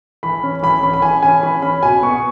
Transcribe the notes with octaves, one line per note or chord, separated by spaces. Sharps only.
E3 B5
C#4
E3 B5
C#4 B5
B5
E3 G#5
C#4 G#5
E3 B5
C#4 B5
B2 G#5
B3 C#6